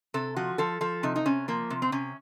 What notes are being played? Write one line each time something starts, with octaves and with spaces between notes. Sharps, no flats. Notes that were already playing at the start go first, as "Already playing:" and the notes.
C3 A4
F3 F#4
F3 A4
F3 A4
C3 D#4
D#4
C3 C#4
F3 A#3
C3
C4
C3 C#4